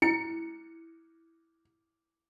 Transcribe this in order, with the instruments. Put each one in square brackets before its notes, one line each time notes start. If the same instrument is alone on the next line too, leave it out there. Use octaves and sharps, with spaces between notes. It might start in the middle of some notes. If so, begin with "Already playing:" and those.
[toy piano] E4 [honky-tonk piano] C#7